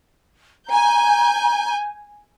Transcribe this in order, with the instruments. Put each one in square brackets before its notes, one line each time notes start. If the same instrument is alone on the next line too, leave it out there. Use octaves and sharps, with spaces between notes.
[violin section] G#5 G6 [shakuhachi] A#5